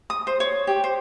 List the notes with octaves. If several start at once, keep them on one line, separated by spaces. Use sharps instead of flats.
D#6
C5
C#5
G4
C5